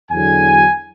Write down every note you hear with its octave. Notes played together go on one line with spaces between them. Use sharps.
E2 D3 F#3 G#5